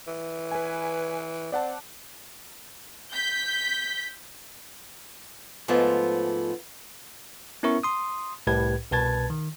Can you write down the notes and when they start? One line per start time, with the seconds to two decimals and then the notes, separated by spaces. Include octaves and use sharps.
0.07 E3
0.52 B4 G#5
1.52 C4 D5 F#5 A5
3.12 G6 B6
5.68 G#2 F3 G#3 A3 B3 F4
7.63 B3 C#4 E4 A#4 E5 C#6
7.83 C6 D#6
8.47 C2 A2 G4 B4 G#6
8.92 C2 B2 B4 A5 G#6 A6
9.30 D#3